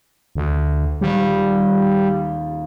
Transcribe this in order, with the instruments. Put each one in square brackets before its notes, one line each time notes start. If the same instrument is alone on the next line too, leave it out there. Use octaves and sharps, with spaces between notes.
[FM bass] D2
[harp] D#1 D#2 [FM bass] G3